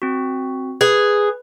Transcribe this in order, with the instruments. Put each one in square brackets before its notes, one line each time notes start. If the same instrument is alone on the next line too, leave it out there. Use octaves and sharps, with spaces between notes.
[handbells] C4 F#4
[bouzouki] G#4 [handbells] B4